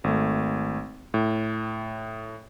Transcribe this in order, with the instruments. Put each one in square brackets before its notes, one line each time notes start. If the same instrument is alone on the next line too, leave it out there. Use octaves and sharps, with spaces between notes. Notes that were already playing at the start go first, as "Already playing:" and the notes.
[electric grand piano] G#1 A3
A2